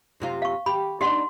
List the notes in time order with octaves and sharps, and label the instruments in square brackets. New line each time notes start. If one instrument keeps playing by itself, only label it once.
[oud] F#2 C3 F4
[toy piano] F5 C#6
[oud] G4 [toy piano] B5
[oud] D4 D#4 [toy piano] G4 F#5 C6